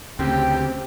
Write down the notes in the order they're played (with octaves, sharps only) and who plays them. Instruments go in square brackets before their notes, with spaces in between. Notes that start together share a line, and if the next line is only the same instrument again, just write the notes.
[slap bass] D2 C#3 [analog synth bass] C4 [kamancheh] G4 [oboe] G5